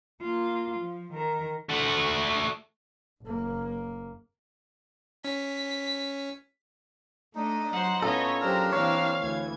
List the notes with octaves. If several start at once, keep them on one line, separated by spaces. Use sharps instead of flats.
A#3 F4
F3
D#3 A#4
A3 F#4
F#1 A#3
C#4 B6
A3 D4 D#4 D#5
F#3 C5 F#5
A2 A3 B3 C#4 F4 A4 C#5 D#5
F#3 D4 G4 A#4 C5 G5 A#5 E6
E3 A#3 C4 C#5 F5
D2 E3 G#6